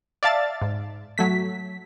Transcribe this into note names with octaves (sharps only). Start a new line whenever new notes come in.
D5 E5 F5 A5 A6
G#2
F#3 A3 B6